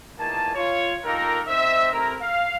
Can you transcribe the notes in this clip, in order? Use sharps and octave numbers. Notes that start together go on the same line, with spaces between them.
E2 A#2 D#3 A#3 G#5 A5
F4 C#5
A#3 D#4 F4 G4 A4 A#4
C4 D#4 C5 D#5 E5
C3 A3 C4 E4 A#4
F5